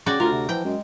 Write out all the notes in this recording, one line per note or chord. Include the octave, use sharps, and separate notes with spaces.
C#3 F#4 D5 G5
D2 F4 A#4
C3
E3 F3 G5
F#2 G#3